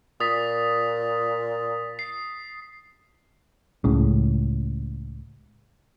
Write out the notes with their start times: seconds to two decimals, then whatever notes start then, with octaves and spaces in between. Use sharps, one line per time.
0.20 A#2 D#6 A6 B6
1.99 C7
3.84 C#2 A2 C#3